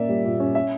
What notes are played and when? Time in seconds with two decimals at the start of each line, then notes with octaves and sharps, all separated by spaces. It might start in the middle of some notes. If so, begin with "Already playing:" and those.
Already playing: A#2 A#3 C#4 D5 E5
0.09 G3
0.25 A#2
0.40 C#4
0.55 E5